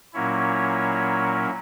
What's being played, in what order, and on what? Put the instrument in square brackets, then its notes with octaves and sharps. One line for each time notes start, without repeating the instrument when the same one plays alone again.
[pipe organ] A#2 F#3 A#3 C#4 E4 C#5